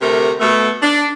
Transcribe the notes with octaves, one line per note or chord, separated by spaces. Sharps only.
D2 C3 A3 A4 A#4
B2 A3
D4